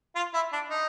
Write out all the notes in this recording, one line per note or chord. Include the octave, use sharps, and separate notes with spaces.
F4
E4
D4
D#4